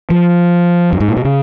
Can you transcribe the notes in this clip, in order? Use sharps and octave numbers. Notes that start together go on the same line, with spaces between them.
F3
F#2
G#2
A#2
B2
C#3